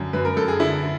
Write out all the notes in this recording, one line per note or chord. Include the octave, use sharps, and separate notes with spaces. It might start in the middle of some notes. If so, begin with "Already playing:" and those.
Already playing: F#2 D3
F#2 B4
A#4
F#2 A4
G#4
D3 E4